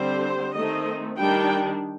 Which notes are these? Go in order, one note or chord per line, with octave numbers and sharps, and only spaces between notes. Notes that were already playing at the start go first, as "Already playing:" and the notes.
Already playing: D3 G3 C4 C5
D#3 A3 C4 D#5
D#3 G3 D4 G5